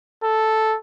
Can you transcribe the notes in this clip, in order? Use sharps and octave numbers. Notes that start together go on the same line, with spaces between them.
A4